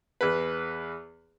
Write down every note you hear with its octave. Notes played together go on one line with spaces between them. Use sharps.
E2 B4